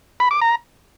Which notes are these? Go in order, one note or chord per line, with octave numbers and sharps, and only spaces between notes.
B5
D6
A#5